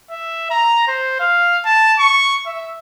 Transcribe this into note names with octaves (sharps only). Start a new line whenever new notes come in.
E5
A#5
C5
F5
A5
C#6
E5